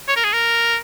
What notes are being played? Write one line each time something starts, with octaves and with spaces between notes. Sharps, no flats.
C#5
A#4
G#4
A#4